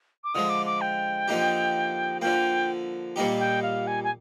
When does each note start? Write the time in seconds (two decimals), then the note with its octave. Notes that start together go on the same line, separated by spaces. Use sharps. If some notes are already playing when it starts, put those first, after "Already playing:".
0.24 D6
0.34 D3 F3 G#3 D#6
0.49 D6
0.66 D6
0.81 G5
1.28 D3 F3 A#3 D#4 G4
2.21 D3 F3 A#3 G5
3.16 A#2 G3 A#3 D#4 G4
3.39 G5
3.62 F5
3.87 G#5
4.04 G#5